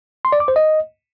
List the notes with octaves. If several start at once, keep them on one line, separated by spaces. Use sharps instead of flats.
C6
D5
D6
C5
D#5